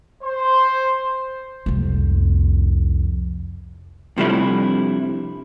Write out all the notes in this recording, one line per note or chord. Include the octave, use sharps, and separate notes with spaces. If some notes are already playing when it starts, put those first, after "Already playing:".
C5
C2 F2
C3 F3 G3 A3 D4 E4